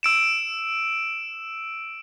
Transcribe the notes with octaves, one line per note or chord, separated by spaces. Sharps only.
E6 D7 E7